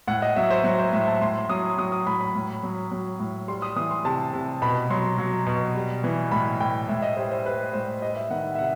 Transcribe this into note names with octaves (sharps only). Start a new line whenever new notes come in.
A2 F#5
D#5
F#3 E5
C5
F#3
C5
A2 E5
A5
A2 C6
F#3 D#6
F#3 D#6
D#6
A2 B5
B5
A2
F#3
F#3
A2
G3 C6
D#6
E3 D#6
C6
C3 A5
C3
B2 B5
F#3 C6
F#3
B2
G3
E3
A2 B5
A2 G5
A2 E5
D#5
G3 C5
C5
G3 B4
A2 C5
G3 D#5
E5
D#3 F#5
E5
C3 F#5